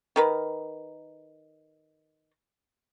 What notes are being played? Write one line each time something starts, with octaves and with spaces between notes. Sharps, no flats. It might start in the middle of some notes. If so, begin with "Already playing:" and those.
D#3 A#4 B4